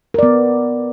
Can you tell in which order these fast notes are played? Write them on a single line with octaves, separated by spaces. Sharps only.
A#4 D5 B3